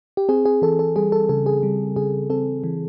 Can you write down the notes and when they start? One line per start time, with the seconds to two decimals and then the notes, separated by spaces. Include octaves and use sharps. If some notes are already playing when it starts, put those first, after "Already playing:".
0.17 G4
0.29 C4 G#4
0.45 G#4
0.62 E3 A4
0.79 A4
0.96 G3 G#4
1.12 A4
1.29 C#3 A4
1.46 G#4
1.63 G3
1.96 C#3 G#4
2.30 C4 A4
2.64 E3